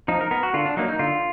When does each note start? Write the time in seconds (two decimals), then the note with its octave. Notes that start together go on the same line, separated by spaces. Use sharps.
0.08 F3 D#4
0.21 A#4
0.31 B3 A#4
0.43 F#4
0.54 D3 F4
0.66 D4
0.77 F#3 A#3 D#4
0.88 D#4
0.99 D3 F4